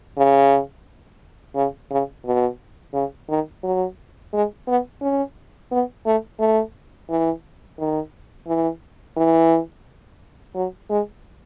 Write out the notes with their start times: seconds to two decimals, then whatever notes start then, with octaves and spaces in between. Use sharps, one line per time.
0.17 C#3
1.55 C#3
1.91 C#3
2.25 B2
2.94 C#3
3.29 D#3
3.63 F#3
4.33 G#3
4.67 B3
5.02 C#4
5.72 B3
6.06 A3
6.40 A3
7.10 E3
7.79 D#3
8.47 E3
9.17 E3
10.55 F#3
10.90 G#3